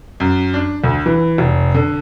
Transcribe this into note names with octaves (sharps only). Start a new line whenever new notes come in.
F#2
D4
D2
E3
F1
D3